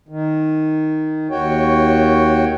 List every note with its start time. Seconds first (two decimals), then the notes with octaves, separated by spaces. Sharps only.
0.09 D#3
1.31 D#2 F#4 C#5 G5